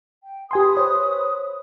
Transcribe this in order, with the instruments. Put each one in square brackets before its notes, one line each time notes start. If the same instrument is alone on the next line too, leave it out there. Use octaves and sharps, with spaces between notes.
[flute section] G5
[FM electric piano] G4 G#5 C6 [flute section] B4 D#6
[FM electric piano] C5 C#5